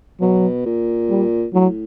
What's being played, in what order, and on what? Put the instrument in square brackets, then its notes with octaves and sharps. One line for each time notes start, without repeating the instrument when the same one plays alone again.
[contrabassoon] B2 [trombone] F#3
[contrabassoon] A#2
[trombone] G3
[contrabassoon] A2 [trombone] F#3